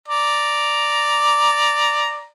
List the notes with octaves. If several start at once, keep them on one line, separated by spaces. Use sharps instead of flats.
D5 A#5